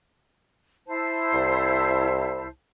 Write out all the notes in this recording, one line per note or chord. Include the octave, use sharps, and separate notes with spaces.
E4 C5 A5
C2